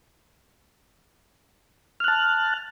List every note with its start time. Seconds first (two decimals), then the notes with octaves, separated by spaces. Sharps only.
2.00 F6
2.04 F#6
2.08 A5